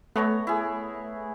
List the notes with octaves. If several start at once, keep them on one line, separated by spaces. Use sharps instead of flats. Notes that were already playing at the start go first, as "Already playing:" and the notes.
A3 B3 C#5 A#5
E4 G#4